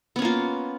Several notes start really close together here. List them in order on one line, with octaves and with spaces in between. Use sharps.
B3 C#4 A#3 F4